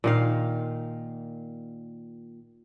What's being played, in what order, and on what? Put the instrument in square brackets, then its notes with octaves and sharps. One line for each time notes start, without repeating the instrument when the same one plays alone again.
[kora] A#2 D#3 F5